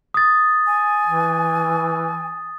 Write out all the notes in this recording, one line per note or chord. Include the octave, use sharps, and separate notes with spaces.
D#6 A6
G#5
E3